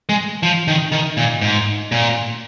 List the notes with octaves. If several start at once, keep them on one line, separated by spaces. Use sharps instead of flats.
G#3
F3
D#3
D#3
A#2
G#2
A#2